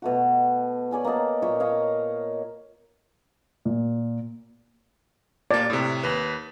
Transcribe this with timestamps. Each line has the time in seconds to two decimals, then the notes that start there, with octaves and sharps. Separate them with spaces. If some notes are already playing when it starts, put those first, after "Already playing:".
0.02 B2 A3 F#4
0.91 C#5 D5 G#5 B5
1.04 A#3 D5 D#5 A5
1.42 A#2 C#5 E5
1.60 C#5 D#5 F5
3.65 A#2
5.51 A#2 A#3 D5
5.70 A2 C3
6.03 D#2 B4